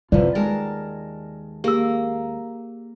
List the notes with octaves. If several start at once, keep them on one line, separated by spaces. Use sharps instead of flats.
C3 E3 F3 F4 D5
D#2 G#3 A#4 A5
A#3 G4 G#4 E6